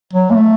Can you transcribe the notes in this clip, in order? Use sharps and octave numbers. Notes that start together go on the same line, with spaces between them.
F#3
A#3
A3